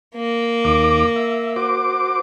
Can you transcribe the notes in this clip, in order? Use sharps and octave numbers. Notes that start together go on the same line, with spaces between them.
A#3
D#2 D6
E5
F#4 C5 D6